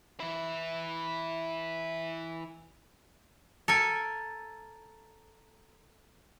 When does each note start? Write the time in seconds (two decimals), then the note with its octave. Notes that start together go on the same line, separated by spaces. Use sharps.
0.20 E3 E4
3.68 A4 A#4 G#5